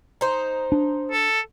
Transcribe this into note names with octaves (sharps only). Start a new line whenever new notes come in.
D#4 C5
D4
A4